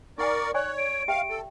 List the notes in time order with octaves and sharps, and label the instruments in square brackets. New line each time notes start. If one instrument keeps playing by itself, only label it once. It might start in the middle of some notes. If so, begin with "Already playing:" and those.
[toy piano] D#4 F#5 G#5 [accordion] A#4 D5 [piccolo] C#6
[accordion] C#5 [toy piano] D5 G#5 C#6 [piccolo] F#6
[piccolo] D7
[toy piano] G4 E5 G5 [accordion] F5
[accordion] A4